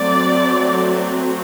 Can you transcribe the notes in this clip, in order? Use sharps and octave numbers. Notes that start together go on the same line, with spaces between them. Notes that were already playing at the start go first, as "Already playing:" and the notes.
Already playing: F#3 A3 C4 D5